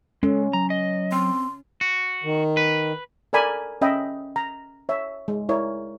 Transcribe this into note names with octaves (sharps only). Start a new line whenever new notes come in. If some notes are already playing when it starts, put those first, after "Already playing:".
G#3 C#4 A4
F#3 A#5
D#5
C4 C6
F#4
D#3
B4
A4 A#4 D5 G#5 B5
C#4 D#5 E5 G5 B5
A#5
C#5 E5
G#3
E4 A#4 C#5 D5